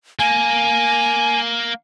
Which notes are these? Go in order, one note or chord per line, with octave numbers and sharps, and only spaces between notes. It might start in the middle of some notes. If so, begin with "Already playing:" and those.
A#3 G#5